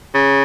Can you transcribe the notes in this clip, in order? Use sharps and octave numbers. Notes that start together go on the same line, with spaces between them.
C#3